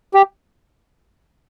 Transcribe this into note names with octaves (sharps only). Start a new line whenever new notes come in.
G4